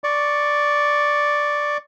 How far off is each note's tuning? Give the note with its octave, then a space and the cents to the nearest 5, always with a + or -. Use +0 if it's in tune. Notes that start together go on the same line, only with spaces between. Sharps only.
D5 +0 C#6 +0